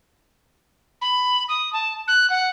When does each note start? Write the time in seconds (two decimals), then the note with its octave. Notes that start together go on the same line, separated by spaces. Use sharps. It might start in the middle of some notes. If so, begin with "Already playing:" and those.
1.02 B5
1.49 D#6
1.73 A5
2.08 F#6
2.30 F#5